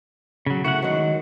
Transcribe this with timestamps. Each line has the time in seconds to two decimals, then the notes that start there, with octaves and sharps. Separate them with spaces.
0.46 C#3 F#3
0.64 A3 E4 F#4 F#5
0.82 D#3 F#3 G#3